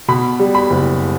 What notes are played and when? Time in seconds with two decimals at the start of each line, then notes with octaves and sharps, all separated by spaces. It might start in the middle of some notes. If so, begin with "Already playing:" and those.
0.08 B2 B5
0.39 G3
0.55 B5
0.70 F#1